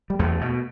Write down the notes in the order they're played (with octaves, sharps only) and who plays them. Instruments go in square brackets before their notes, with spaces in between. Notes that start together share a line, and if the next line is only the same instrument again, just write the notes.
[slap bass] G3
E2 A3
B2